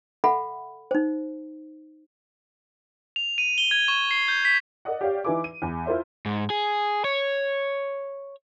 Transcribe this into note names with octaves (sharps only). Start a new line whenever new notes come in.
A4 E5 F#5 B5
D#4 C5
F7
D#7
G7
G#6
C#6
C7
G6
B6
A#4 D5 D#5 F#5
G4 C#5 D5 F5
E3 D#4 E4 B4 G#5 D6
D#7
E2
E4 F4 A#4 C5 E5
G#2
G#4
C#5